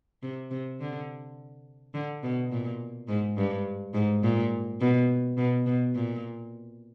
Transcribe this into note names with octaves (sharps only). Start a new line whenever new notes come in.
C3
C3
D3
D3
B2
A#2
G#2
G2
G#2
A#2
B2
B2
B2
A#2